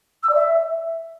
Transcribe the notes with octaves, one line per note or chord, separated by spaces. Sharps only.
E6
D5
E5